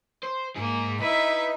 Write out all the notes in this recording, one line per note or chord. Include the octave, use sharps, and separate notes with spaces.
C5
G#2 A#3 G#4
D#4 E4 B4 E5